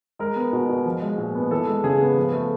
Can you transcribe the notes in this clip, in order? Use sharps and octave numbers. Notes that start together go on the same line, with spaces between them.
G#3 A#4
B3
B2
B2
F3
G#3
A#2
B3
E3 A4
G#3
C#3 G#4
B3
F3
A3